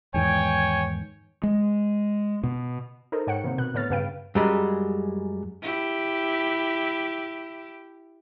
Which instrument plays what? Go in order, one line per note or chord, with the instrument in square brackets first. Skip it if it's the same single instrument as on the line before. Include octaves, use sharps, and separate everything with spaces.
[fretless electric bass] E2 G#2 D#3 [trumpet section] C#5 G5 G#5
[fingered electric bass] G#3
B2
[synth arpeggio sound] D#4 A4 A#4 C5
G#2 C#5 F#5 G5 C#7
C3 D#3 A#3 C4
B2 F#6
A2 D3 B3 C#5 F6 A6
G2 C#3 B4 F5 G5 D7
[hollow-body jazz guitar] F#2 G3 G#3
[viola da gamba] E4 G4